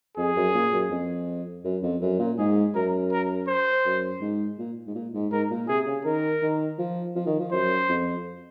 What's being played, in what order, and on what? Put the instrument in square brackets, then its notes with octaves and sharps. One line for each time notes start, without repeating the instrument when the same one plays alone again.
[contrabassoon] F2 [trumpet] G#4
[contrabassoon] F#2
A#2
F#2
F2
F#2
F2
F#2
A#2
[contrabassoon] G#2 [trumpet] G#4
[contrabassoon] F#2 [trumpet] A#4
[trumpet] A#4
C5
[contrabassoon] F#2
G#2
A#2
G#2
A#2
G#2
[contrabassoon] G#2 [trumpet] A#4
[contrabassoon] A#2
[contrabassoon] C3 [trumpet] G#4
[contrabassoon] C#3
[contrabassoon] D#3 [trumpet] A#4
[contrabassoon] D#3
F3
F3
D#3
F3
[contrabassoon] F#2 [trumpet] C5
[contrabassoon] F2